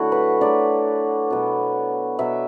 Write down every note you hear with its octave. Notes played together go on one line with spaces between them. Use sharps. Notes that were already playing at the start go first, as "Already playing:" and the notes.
Already playing: D3 F#3 A3 E4 F#4
B4
D3 F#3 A3 D5
B2 F#3 B3
B2 F#3 B3 E5